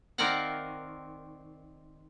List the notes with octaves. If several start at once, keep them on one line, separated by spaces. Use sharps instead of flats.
D#3 C4 A#4 D5 F5 F#5